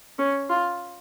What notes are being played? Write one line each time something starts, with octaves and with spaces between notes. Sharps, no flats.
C#4
F4